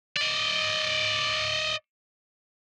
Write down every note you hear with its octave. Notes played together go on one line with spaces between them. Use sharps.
D5 D#5